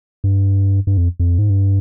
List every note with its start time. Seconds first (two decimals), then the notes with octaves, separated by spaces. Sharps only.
0.24 G2
0.87 G2
0.97 F2
1.20 F2
1.39 G#2
1.50 G2